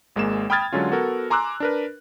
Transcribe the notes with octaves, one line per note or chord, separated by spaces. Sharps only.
G#1 G#3 A#3 E7
G5 B5 D#6 F6 G#6 A6
D3 F#3 G#3 C#4 F4
B3 F#4 A4 A#4
G#5 A#5 C6 D6 E6 F#6
D4 A#4 B4